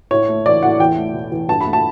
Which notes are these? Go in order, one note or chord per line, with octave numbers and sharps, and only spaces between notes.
A2 C#5
A3
E3 D5
A2 F#5
E2 G5
A3
B2
E2
G2 A5
B5
A3
A5